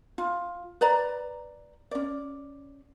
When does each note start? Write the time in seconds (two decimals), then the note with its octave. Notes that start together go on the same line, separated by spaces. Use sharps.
0.18 F4
0.81 B4 D5 A#5
1.91 C#4 D5